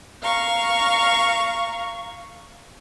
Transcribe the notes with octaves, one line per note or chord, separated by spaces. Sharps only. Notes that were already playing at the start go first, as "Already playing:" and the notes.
F5 A#5 C#6